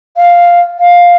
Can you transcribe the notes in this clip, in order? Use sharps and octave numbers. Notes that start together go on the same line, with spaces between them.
F5
F5